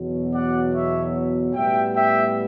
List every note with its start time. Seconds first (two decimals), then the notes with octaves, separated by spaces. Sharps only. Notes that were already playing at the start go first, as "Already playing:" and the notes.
Already playing: E2 B2 F#3
0.33 D5 F#5
0.74 C#5 E5
1.54 A2 G3 B3 E5 G5
1.95 E5 G5